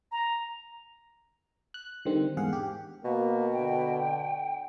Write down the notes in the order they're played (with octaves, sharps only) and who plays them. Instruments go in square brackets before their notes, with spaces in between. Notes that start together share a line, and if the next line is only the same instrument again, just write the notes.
[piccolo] A#5
[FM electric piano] F#6
D3 D#3 G3 C4
E2 G#2 G#4 F5 F#5
G4
[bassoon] B2 [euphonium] A#3
[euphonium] D3 [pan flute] G5